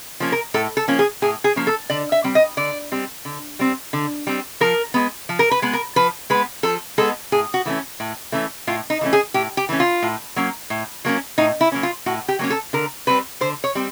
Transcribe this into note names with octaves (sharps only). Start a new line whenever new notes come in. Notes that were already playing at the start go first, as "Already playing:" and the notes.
F3 A#3 C#4
A#4
A2 A4
A4
F3 A#3 C#4
G#4
A2 G#4
G#4
F3 A#3 C#4
A4
D3 D5
E5
G3 C4
D#5
D3 D5
G3 C4
D3
G3 C4
D3
G3 C4
F3 A#4
G#3 B3
F3
A#4
B4
G#3 B3
A#4
F3 B4
G#3 B3 B4
F3 A4
G#3 B3 A4
A2 G#4
F#4
E3 A3 C#4
A2
E3 A3 C#4
A2 F4
D#4
E3 A3 C#4
G#4
A2 G4
G4
E3 A3 C#4
F4
A2
F#3 A#3 C#4
A2
F#3 A#3 C#4
A2 D#4
E4
F#3 A#3 C#4
F4
A2 F#4
G4
F#3 A#3 C#4
A4
D3 A#4
G3 C4 B4
D3 C5
C#5
G3 C4